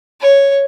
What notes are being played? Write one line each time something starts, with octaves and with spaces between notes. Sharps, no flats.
C#5